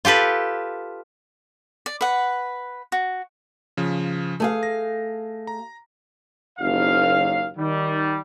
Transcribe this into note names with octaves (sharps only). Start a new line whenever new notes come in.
F4 G4 A4 B4
D5
B4 F#5
F#4
C#3 F3
A3 G#4 F5
A#6
A#5
F#1 D#2 F5
D#3 G3